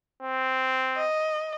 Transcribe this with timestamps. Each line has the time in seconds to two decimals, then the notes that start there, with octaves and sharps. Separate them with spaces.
0.22 C4
0.97 D#5